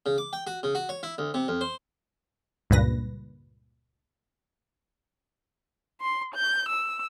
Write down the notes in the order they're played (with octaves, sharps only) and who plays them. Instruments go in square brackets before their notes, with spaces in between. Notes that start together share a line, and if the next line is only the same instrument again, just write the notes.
[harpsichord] C#3
D6
G5
F#4
C#3
F#4
C#5
E4
D2
C3
F2
C5
[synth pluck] C#2 G2 A#2 B4 A#6
[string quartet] C6
G6
E6